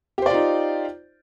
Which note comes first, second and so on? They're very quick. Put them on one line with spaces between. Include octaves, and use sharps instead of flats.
G4 C5 D5 F4 D#4